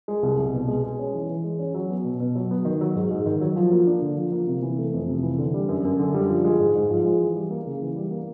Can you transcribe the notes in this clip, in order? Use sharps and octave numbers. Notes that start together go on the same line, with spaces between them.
G#3
C2
C2
B2
G#3
G#3
C#4
E3
E3
G#3
C#4
F#3
B3
B2
B2
F#3
B3
D#3
F#3
G#2
G#2
D#3
F#3
F3
A#3
D4
D3
F3
A#3
C3
E3
A3
F2
C3
E3
D3
G3
F#2
F#2
D3
G3
F3
G#3
G#2
G#2
F3
G#3
E3
G3
A#3
C#3
E3
G3
A#3